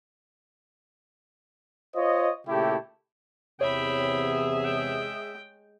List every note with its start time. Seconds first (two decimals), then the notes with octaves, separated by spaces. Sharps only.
1.95 F4 C5 C#5 D#5
2.47 A#2 C#3 A3 E4 G4
3.61 E2 C3 G#4 C#5 E5 G5 B5
4.65 G#3 G5